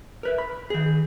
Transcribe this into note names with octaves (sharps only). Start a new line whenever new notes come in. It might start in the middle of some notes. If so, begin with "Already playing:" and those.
A#4 B4 E5
B5
D#3 G#4